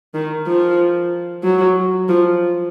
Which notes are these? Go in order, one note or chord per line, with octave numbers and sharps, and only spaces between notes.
D#3
F3
F#3
F3